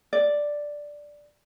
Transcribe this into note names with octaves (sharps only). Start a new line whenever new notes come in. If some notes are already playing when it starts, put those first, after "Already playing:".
D5